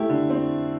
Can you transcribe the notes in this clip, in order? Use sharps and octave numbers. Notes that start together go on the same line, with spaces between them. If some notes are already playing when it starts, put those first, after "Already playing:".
Already playing: A3 E4 G4
D3
C4